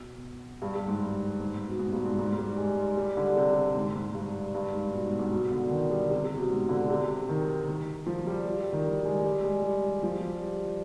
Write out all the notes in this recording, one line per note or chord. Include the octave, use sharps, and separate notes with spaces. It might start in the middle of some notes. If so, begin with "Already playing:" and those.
Already playing: B2
G2
G2
G#2
G#2
B2
G#2
G2
G#2
G#2
G3
G#3
G3
D3
C3
G#2
G#2
G2
G2
G#2
B2
G#2
G#2
B2
D3
D#3
G3
C3
C3
B2
G#2
D3
C3
D#3
D#3
F3
G3
G3
G3
D#3
G3
G#3
G3
G#3
G3
F3
G3